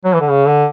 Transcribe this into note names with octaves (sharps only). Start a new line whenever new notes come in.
F#3
E3
D3
C#3
D3